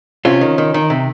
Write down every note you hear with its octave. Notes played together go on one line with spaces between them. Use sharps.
C3 C#4 F4
D#3
D#3
D#3
C3